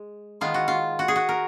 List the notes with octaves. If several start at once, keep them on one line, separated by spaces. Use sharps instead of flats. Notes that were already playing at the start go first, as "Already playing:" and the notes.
Already playing: G#3
D#3 G#3 B3 F4
F#4
F4
F#4
G#4
F#4
A#4